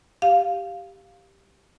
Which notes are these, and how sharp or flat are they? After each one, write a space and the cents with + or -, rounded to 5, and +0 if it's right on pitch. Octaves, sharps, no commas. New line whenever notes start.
G4 +0 F5 +0